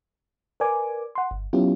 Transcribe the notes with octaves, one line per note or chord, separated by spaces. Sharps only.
A#4 B4 D5 G#5 D6
F#5 C6
G1
F#3 B3 C#4 E4 F4 G4